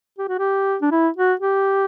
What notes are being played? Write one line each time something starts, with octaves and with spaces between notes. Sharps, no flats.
G4
F#4
G4
D4
E4
F#4
G4